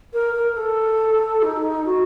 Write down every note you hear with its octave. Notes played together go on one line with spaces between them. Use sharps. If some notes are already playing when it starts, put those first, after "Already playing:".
A#4
A#4
A4
D#4
F#4